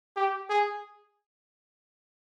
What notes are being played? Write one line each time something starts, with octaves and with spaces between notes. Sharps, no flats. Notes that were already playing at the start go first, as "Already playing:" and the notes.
G4
G#4